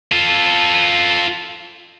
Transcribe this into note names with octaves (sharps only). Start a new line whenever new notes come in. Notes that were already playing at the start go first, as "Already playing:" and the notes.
F4 A4